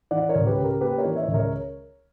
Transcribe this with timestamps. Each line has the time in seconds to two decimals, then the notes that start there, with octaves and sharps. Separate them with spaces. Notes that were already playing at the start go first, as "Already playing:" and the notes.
0.11 E3 D5 F#5
0.29 A#4 C#5
0.35 C#2
0.46 G4 B4
0.58 C#3
0.63 A#4
0.81 A#3 G4 B4
0.98 A#4 C#5
1.05 E3
1.16 C#5 E5
1.28 C#2
1.34 A#4 C#5